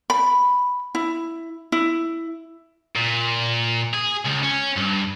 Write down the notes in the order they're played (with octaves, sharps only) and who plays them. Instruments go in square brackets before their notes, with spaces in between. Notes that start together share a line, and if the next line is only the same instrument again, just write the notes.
[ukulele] B5
E4
E4
[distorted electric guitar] A#2
G#4
C#2
C#4
G2